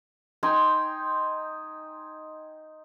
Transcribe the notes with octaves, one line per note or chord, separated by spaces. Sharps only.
D#4 G5 G#5 C6